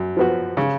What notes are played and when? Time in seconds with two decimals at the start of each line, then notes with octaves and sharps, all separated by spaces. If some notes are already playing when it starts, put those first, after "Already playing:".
Already playing: F#2
0.17 F3 B3 F#4
0.57 C#3